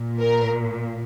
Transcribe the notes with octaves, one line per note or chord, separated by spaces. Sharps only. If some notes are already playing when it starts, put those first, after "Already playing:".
Already playing: A#2
A#4